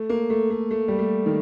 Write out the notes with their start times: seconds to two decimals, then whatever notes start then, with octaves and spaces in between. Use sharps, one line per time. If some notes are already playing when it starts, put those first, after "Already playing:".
Already playing: A3
0.10 A#3
0.30 A3
0.50 A3
0.71 A3
0.88 G3
0.99 A3
1.26 D#3